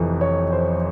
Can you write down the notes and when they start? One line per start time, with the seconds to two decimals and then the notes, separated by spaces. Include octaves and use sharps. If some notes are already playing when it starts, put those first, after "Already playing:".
Already playing: F1 F2 E3
0.21 C#5
0.52 C5